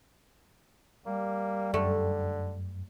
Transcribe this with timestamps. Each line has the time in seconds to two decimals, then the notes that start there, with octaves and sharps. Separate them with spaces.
1.06 G3 A#3
1.74 F#2 D3 A3